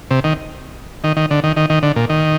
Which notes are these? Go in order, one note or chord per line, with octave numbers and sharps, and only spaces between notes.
C3
D#3
D#3
D#3
D3
D#3
D#3
D#3
D3
A#2
D#3